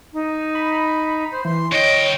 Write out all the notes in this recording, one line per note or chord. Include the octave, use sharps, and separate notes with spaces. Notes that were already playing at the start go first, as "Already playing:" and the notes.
D#4
B5
C5
E3 C6
D3 C#5 D#5 G5